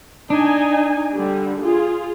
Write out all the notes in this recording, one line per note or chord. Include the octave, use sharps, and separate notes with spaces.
D4 D#4 G#5
D3 G3
F4 G#4